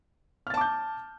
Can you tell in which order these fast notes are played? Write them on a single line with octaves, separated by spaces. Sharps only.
F6 A6 A5 D6 G6